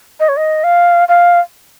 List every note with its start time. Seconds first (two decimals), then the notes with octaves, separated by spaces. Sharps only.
0.20 D#5
0.29 C#5
0.37 D#5
0.64 F5
1.08 F5